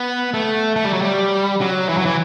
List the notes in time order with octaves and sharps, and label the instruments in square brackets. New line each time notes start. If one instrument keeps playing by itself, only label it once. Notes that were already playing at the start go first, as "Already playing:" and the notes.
Already playing: [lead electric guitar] B3
A3
A3
G3
F#3
G3
F#3
E3
F#3
E3